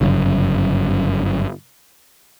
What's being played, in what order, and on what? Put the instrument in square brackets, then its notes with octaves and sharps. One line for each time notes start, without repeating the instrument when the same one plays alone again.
[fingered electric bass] G1 F#2 C#3